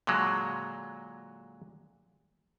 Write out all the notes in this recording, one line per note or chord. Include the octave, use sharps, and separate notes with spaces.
A#2 D3 F#3 G#3